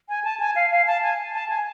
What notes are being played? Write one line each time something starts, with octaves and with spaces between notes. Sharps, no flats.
G#5
A5
G#5
F5
F5
A5
G#5
A5
G#5